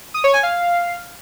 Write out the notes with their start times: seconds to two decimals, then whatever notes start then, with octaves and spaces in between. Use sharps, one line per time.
0.14 D#6
0.24 C#5
0.34 G#5
0.43 F5